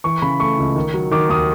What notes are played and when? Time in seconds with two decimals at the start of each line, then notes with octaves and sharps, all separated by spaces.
0.04 E3 C#6
0.22 C#3 B5
0.40 A3 C#6
0.59 C#2
0.76 D#3
0.94 F#3
1.11 D#3 D6
1.29 D#2 D#6